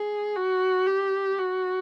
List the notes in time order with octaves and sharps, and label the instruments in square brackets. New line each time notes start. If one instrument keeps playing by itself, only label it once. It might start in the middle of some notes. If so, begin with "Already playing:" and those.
Already playing: [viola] G#4
F#4
G4
F#4